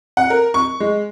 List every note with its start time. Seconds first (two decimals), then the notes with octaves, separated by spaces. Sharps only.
0.17 F#5
0.30 A#4
0.54 C#6
0.80 G#3